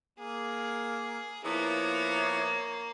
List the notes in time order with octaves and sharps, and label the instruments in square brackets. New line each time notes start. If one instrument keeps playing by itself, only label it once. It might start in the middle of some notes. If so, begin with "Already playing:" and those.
[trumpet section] A#3 [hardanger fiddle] G#4
[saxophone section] F3 B3 E4 [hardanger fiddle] A#3 [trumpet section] C#5